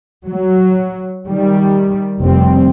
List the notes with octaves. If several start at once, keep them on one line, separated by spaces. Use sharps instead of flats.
F#3
D#3 G3
F1 G3 C4